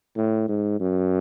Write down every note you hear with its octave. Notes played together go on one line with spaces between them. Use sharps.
A2
G#2
F#2